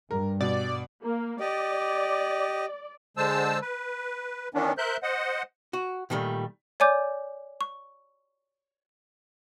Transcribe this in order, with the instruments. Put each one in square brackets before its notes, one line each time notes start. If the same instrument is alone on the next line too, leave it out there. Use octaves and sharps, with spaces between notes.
[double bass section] G2 [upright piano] A#4
[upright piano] B2 [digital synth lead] D5
[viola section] A#3
[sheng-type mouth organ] G4 D#5 [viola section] D5
[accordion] D3 G#3 C5 A5 E6
B4
D#3 E3 B3 C#4 D4
A#4 C5 E5 F#6 G6
C5 D#5 F#5
[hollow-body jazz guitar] F#4
A#2 D#3 F#3 G3 A3
[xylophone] C#5 D5 G#5 D6 G6
C#6